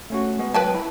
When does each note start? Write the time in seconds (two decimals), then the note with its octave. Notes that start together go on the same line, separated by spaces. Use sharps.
0.10 A3 C#4 F#4
0.39 G#3 B3
0.54 F#3 B4 G5 A5
0.75 E4 E5